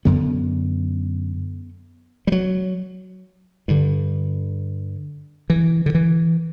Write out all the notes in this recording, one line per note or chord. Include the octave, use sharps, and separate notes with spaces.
F#2 D3 B3
G3
F#3
G2 D3
E3
D3
E3